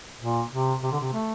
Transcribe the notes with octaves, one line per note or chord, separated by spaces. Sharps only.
A#2
C3
C3
D3
C3
A3